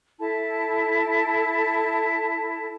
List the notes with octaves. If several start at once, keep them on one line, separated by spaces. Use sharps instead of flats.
E4 A4 A5